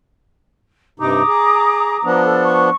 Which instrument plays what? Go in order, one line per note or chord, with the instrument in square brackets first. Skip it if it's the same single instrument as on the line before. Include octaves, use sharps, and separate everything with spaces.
[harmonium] G2 C3 D#4 [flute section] A#5 D6 D#6
[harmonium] G#4
F3 B3 D4
[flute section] A4
C#6